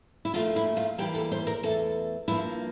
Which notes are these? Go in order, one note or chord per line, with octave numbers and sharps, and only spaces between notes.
E4
A#2 F3 A3 F4
E4
F4
E2 E3 G3 A#3 G4
A4
C5
A#4
E2 E3 A3 A4
G2 F3 A#3 E4